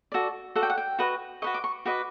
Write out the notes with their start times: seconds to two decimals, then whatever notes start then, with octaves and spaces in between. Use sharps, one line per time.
0.12 F#4 A4 D5
0.55 F#4 A4 D5 F#5
0.63 G5
0.70 F#5
0.78 G5
0.99 F#4 B4 D#5
1.42 F#4 B4 D#5 C#6
1.54 D6
1.64 C#6
1.85 F#4 B4 D#5 D6